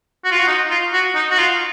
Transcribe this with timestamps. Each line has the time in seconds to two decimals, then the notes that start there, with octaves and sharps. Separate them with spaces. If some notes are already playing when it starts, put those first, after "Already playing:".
0.24 F#4
0.31 F4
0.38 F#4
0.47 D#4
0.70 F4
0.93 F#4
1.15 D#4
1.30 F#4
1.38 F4